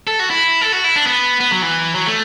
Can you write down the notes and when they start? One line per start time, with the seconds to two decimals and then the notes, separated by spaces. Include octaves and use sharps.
0.07 A4
0.19 F#4
0.30 E4
0.61 A4
0.72 F#4
0.84 E4
0.96 D4
1.07 B3
1.40 B3
1.51 F#3
1.62 E3
1.95 F#3
2.07 A3